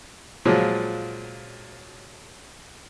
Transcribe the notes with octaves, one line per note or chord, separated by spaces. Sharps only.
A#2 F3 F#3 G#3